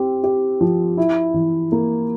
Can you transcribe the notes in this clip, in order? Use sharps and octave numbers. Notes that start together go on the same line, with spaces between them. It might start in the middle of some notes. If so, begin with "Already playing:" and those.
Already playing: C4 G4
G4
F3
E4
E3
A#3